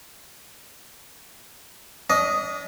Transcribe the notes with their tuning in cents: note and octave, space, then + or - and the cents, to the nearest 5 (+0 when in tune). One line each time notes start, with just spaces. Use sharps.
D4 -40 D#5 +0